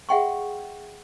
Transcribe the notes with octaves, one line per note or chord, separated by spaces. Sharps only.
G#4 E5 F#5 G5 C6 C#6